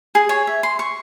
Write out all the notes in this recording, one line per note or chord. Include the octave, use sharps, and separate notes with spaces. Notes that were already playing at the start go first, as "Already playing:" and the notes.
G#4
C#5
E5
C6
C#6